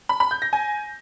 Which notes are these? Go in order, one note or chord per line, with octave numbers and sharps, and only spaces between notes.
B5
B5
G6
A#6
G#5